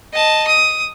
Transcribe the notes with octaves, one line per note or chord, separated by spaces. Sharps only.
D#5 A5
D#6